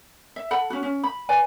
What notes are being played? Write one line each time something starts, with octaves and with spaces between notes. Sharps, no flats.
E5
A4 F#5 B5
C#4 F#4
C#4
B5
B4 D5 G#5